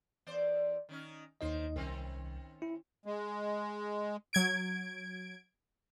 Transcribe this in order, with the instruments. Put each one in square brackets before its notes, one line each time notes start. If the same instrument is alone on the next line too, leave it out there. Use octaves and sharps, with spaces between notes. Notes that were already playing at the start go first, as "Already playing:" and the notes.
[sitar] E2 C5 D5
D#3 C#4 D#4
[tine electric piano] D#2 D#4 D#5 [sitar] D#3 C5
[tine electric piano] C2 [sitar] D#3 C4 C#4
[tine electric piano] E4
[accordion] G#3
[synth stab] F#3 G#6 D7